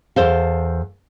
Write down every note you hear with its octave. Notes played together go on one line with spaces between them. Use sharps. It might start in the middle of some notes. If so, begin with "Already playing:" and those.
E2 A4 C5 F5